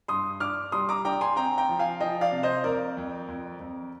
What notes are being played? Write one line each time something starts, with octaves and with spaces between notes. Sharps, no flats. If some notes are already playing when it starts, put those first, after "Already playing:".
G2 C6 D#6
D4 D6 F6
G3 C6 D#6
A#5 D6
D4 G5 A#5
G#5 C6
C4 G5 A#5
G5 A#5
F3
F5 G#5
F3 D#5 G5
D5 F5
C3
C5 D#5
F2 A#4 D5
F2
F2
F2